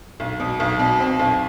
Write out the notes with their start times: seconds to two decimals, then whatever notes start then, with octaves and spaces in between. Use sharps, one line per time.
0.20 B1
0.40 B2
0.60 B1
0.79 B2
1.00 C4
1.19 B1